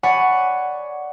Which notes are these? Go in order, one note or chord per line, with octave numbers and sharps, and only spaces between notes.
C#5 D5 F#5 G#5 B5